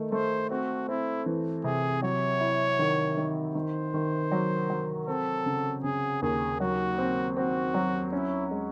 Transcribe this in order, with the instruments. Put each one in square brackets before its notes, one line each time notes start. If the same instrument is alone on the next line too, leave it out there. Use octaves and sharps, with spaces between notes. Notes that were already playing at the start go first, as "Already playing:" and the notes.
Already playing: [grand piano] D#3 A3 D#4
[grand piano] A3 [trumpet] C5
[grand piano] C4 [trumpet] F#4
[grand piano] C4 [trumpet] E4
[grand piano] E3
[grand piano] C3 [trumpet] G#4
[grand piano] F#3 [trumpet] C#5
[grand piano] E4
D#3
D#3
[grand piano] D#3 [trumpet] C5
[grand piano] D#3
F#3
F#3
[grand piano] C4 [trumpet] A4
[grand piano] C#3
[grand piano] C#3 [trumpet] G#4
[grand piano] D#2 [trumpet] G#4
[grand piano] F#3 [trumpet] F#4
[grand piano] C4
[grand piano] C4 [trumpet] F#4
[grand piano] F#3
[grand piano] C#4 [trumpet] E4
[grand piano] G#3